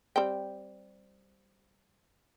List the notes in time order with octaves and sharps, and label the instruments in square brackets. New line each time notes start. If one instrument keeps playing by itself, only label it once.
[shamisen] G3 C4 G5